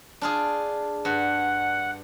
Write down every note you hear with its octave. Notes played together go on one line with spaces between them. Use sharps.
D4 F4 G#4
G2 F#5